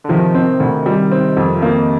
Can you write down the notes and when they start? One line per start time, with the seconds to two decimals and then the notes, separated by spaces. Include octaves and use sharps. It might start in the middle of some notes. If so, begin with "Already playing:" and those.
0.04 D3
0.09 C3 D#3 F3
0.34 C4
0.60 D2
0.86 G3
1.11 C4
1.37 F2
1.55 F3
1.62 C3 D#3 A#3